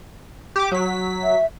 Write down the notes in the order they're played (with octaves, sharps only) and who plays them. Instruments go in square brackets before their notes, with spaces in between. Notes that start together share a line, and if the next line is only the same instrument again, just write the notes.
[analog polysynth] G4 D6
F#3 B6
[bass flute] E5